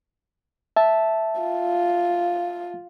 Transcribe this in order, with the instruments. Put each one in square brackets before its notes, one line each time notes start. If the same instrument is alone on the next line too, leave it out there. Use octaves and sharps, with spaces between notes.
[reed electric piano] E5 A5
[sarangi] F4